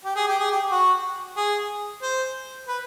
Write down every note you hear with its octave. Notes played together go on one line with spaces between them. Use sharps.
G4
G#4
G4
G#4
G4
F#4
G#4
C5
B4